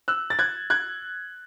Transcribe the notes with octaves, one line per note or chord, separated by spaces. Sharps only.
E6 F#6
A6
F#6 G#6
F#6 G#6